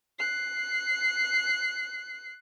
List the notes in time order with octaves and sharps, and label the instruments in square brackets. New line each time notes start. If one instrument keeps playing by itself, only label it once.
[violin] F#6 C7